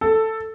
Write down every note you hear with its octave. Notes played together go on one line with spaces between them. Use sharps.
A4